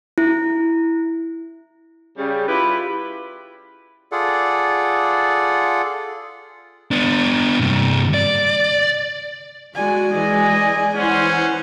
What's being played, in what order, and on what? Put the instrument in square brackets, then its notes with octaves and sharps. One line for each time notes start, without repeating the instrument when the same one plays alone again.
[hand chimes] E4
[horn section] C#3 G3
E4 F4 G4 B4
[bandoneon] F4 G#4 A4 D5 F#5
[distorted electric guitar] B3 D4
G2 C3
D5
[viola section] G#3 F#4 [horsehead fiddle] D5 G#5
[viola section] E3 G#3 [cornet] D#5
[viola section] E3 C5 F#5 [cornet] C#4